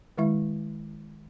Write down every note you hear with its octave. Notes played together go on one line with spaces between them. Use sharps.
D#3 G#3 E4 E5